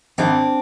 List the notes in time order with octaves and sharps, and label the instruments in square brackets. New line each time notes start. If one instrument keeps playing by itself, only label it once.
[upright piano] G#1 [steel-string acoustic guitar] C4 D4